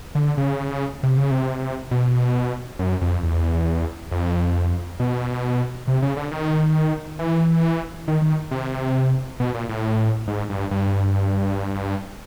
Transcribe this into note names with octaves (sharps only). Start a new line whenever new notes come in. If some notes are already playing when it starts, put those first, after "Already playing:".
D3
C#3
C3
C#3
C3
B2
F#2
F2
E2
F2
B2
C3
C#3
D3
D#3
E3
D#3
D#3
C3
B2
A#2
A2
G#2
G2
G2